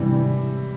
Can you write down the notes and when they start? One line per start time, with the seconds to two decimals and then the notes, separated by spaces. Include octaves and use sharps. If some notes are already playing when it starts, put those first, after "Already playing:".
Already playing: G#2 C3 E3 G3
0.12 E3